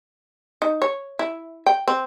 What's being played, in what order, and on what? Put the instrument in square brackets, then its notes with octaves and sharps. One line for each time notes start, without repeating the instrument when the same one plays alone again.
[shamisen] D#4
C#5
E4
G5
C4